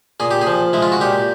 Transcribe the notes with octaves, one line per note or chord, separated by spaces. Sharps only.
A#2 G#4
G4
G#4
F3
G#3 E4
F4
F#4
A#2 G4